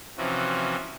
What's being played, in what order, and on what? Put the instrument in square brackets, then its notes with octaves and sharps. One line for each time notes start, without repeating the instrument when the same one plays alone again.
[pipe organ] C3 E3 F3 C#4 F#4